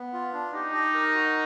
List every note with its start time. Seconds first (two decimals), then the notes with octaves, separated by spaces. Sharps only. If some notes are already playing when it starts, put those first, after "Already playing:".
Already playing: B3
0.13 F4
0.33 D4
0.53 D#4 G4
0.74 D#5
0.94 A#4
1.14 F#4